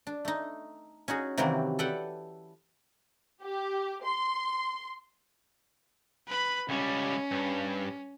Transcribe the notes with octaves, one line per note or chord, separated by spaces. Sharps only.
D4
A3 D#4
C#4 D#4 F#4 G#4
C3 D#3 E3 F#3 A#3 C4
A4 B4 D5 E5 F#5 G5
G4
C6
B4 B5
C#2 G3 C#4
G2